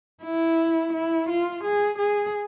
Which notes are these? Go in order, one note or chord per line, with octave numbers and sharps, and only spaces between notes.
E4
E4
F4
G#4
G#4